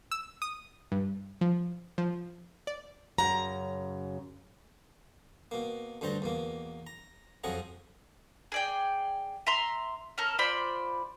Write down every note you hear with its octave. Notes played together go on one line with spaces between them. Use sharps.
E6
D#6
G2
F3
F3
D5
F#2 C#3 A#5
B2 A#3
D2 G2 G3 C5 A5 A#5
E2 B2 A#3
A#5
F2 F3 F#3 G#4 F#5 A#5
G#4 D5 G5
E5 A#5 C6
C#4 A4 A#4
F4 C5 D5 B5